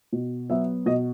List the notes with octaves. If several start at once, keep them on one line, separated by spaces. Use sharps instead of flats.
B2
F#3 B3 E5
B2 D#5